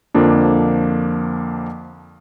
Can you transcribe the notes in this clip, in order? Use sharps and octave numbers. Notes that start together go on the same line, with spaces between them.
F2 D3 F3 A#3 D4